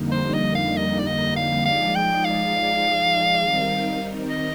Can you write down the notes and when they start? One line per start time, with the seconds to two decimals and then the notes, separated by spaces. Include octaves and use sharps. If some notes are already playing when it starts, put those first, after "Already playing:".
Already playing: F2 D3 G3 A#3 D#4
0.12 C5
0.33 D#5
0.55 F5
0.77 D#5
0.99 D5
1.07 D#5
1.36 F5
1.65 F3 G#3 D#4 G#4 D5 F5
1.95 G5
2.24 F5
3.42 D#3 G3 C4 D#4 A#4
4.30 D#5